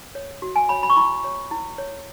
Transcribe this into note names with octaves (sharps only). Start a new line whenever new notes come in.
C#5
F#4
G#5
C#5 B5
B5
C#6
E4 B5
C#5
E4
C#5